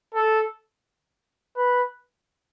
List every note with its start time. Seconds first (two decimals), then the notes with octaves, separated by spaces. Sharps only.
0.14 A4
1.57 B4